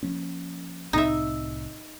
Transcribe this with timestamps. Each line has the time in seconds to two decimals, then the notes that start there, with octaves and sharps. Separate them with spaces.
0.03 F3 A#3 C#4
0.93 C2 A2 C4 D#4 E5